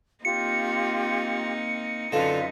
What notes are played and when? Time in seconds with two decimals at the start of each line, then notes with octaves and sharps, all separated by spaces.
0.25 A#3 C4 D#4 F4 G4 C#7
2.12 F#2 D3 D#4 F4 B4 F5